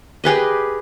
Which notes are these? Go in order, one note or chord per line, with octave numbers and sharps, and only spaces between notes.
G4 G#4 B4 D#5